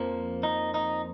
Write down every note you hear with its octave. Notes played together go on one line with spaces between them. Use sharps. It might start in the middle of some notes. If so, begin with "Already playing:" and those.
Already playing: F2 F3 A#3
D#4
D#4